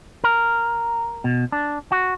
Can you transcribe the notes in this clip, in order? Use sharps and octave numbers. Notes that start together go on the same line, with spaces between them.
A#4
B2
D4
F#4